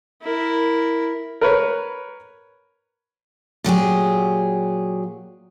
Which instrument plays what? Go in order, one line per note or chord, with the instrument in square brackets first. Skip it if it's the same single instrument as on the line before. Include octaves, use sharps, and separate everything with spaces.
[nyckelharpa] E4 A#4
[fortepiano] A#4 B4 C#5
[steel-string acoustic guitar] A#2 F#3 G4 G#4